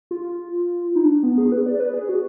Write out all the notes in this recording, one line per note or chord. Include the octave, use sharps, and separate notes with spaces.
F4
D#4
D4
B3
G#4
B4
D5
B4
G#4
F#4